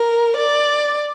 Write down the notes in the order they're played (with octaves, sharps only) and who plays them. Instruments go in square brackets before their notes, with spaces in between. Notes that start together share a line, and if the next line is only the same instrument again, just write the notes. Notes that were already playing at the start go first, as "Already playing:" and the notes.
Already playing: [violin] A#4
D5